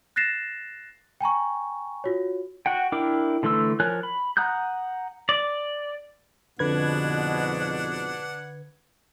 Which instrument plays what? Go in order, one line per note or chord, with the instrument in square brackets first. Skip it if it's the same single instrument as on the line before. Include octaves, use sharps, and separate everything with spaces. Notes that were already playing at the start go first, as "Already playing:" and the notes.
[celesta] F#6 A6 A#6 C7 E7
G5 G#5 A#5 C#6
F4 F#4 C#5
[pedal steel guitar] F#4 F#5 G5
D4 E4 A#4 G5 D6
D3 E3 A3 C6 E6
F3 A#4 C#5 G#5 F#6
B5
F#5 A#5 D#6 F#6 G6
D5
[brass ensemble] F2 G#2 B2 [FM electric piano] D3 B4 G#6 [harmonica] D4 F#5